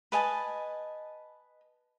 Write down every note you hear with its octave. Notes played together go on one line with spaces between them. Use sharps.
B4 D#5 G#5 A5